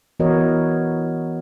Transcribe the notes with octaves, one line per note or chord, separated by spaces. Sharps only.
E3 B3 F#4 A#4 C#5 D#5